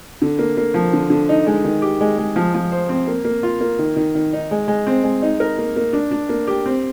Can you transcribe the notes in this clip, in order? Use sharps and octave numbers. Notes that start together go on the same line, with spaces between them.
D3
A#3
A#3
F3
D3
D3
D#4
G#3
D#3
G4
G#3
G#3
F3
F3
C5
C4
A#3
A#3
F4
A#3
D#3
D#3
D#3
D#4
G#3
G#3
C4
G#3
D#4
A#4
A#3
A#3
D4
D4
A#3
G4
C4